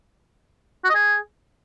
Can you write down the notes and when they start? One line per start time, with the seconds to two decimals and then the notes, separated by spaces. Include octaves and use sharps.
0.84 F#4
0.90 D#5
0.95 G#4